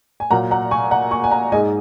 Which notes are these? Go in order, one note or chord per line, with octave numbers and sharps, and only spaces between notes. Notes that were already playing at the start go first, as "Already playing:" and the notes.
G#5
A#2 F#3 A#3 F#5 A#5
F#5 A#5
G#5 C#6
F#5 A#5
G#5 C#6
G#5
F#5 A#5
G#2 G#3 D#5 G#5